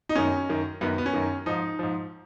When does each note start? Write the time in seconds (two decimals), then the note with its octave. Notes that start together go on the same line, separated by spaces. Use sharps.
0.09 D#4
0.15 F#2 D#3 C#4
0.49 F#2 D#3
0.81 F#2 D#3 B3
0.98 B3
1.06 C#4
1.14 F#2 D#3
1.46 G#2 F3 D#4
1.79 G#2 F3